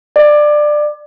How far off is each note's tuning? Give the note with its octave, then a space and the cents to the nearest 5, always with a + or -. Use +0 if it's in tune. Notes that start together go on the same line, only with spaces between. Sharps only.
D5 +20